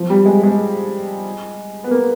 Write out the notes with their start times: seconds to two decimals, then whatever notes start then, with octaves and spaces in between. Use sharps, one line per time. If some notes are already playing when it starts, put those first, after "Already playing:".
Already playing: F3
0.10 G3
0.26 G#3
0.43 G#3
1.84 B3
1.91 A#3